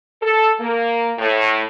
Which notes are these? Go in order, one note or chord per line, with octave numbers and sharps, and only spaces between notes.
A4
A#3
A2